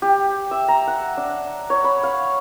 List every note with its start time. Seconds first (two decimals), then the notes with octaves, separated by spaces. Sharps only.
0.02 G4
0.51 E5
0.68 A#5
0.87 F#5
1.17 D4
1.70 C#5
1.84 B5
2.03 F5